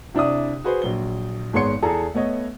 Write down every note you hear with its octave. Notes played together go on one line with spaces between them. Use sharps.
C3 D4 E4 D5 D#6
F#4 G#4 B4 C5
A#1 F#3 G7
G#1 G#3 B3 C#5 C6 C#7
E2 G#4 A4 A5 A#5
A3 B3 C#5 D#5